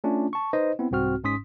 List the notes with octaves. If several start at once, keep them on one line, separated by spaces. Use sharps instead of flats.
A3 C#4 D4 F4
A5 C#6
D#4 B4 C5 D#5
B3 C4 E4
C2 G#2 C4 F#4 F6
G1 G#2 C#4 C6 D#6 B6